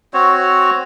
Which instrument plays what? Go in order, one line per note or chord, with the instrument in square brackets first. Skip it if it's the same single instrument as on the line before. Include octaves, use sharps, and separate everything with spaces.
[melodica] C4 F#4 C#5